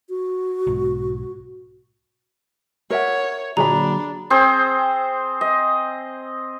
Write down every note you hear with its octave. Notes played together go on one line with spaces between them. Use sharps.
F#4
B1 G#2
A#4 C#5 E5 F#5
A#2 D3 F#3 D4 G#4 A#5 B5
C4 G#4 C5
D#5